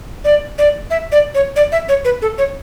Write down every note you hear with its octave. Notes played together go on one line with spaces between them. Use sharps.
D5
D5
E5
D5
C#5
D5
E5
C#5
B4
A4
C#5